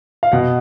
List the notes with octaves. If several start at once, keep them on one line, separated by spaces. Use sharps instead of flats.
F5
B2 F#5